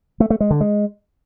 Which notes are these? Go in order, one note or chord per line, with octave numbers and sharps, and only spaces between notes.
A3
A3
G#3
D3
G#3